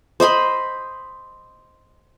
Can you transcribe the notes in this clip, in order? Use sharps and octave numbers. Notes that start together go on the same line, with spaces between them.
C5 D#5 B5 C6